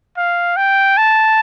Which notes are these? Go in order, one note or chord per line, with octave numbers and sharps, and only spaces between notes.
F5
G5
A5